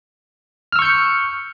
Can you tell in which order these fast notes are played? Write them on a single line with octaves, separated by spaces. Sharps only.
F6 E6 C#6 G6 C#7